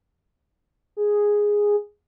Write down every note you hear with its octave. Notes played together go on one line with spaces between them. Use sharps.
G#4